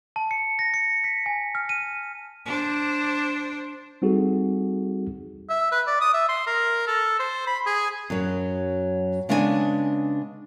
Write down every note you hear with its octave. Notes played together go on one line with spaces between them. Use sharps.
A5
C#7
A#6
C#7
B6
G#5
F6
D#7
D4 C5
G3 C4 D#4 F#4 G#4 A4
E5
B4
D5
D#6
E5
C6
A#4
A4
C5
B5
G#4
F#2 F#3
C#3 G#3 B3 D4 D5 G#5